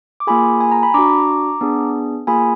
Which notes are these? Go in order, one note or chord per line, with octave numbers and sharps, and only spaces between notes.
D6
A#3 F4 G#4 G#5 B5
G#5
A#5
B5
D4 F#4 A#5 D6
B3 D4 G#4
A#3 F4 G#4 G#5 B5